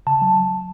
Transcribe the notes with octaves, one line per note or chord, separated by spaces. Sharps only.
C#3 A5
F#3